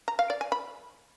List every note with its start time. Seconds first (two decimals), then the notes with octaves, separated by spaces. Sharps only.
0.08 A#5
0.19 F5
0.30 D5
0.41 G#5
0.52 B5